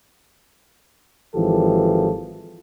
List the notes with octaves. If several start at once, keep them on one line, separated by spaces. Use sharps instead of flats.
G#1 E3 F3 G4 A4